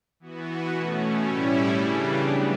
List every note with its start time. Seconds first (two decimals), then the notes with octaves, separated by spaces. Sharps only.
0.20 E3 B3 F#4
0.69 B2 A3 C#4
1.18 A2 G3 C#4 E4
1.68 C#3 E3 G3 D4
2.17 A2 F#3 B3